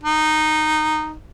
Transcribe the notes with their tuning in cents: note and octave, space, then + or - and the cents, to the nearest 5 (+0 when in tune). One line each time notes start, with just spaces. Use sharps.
D#4 -10